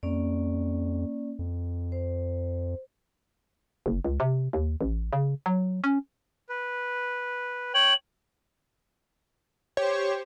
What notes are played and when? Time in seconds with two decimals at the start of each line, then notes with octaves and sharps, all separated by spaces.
0.03 F2 A#3 C#4 D5
1.39 F2
1.92 C5
3.86 F#1
4.05 C#2
4.20 C3
4.53 D#2
4.81 A1
5.13 C#3
5.46 F#3
5.84 C#4
6.49 B4
7.74 C#5 G5 F#7
9.77 G4 C5 C#5